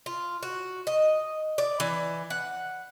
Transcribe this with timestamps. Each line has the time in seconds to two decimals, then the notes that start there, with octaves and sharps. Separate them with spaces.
0.06 F4
0.43 F#4
0.87 D#5
1.58 D5
1.80 E3
2.30 F#5